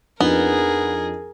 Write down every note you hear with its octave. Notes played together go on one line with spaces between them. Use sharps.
F2 B3 D4 D#4 G#4 A#4